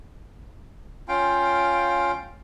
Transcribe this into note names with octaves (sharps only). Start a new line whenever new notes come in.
C#4 F4 F5 G5